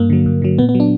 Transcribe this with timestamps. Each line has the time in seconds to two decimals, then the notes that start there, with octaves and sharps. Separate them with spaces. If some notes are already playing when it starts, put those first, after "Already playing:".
Already playing: G2 A#3
0.10 D3 F#3
0.26 G2
0.42 D3 F#3
0.58 A#2 B3
0.69 B3
0.75 F#3
0.80 D4